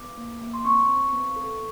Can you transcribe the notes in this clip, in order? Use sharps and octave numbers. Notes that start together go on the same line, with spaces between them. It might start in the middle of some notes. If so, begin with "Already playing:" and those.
Already playing: B3 D6
A#3
A#3
C6
C4 C#6
C4
B3
A4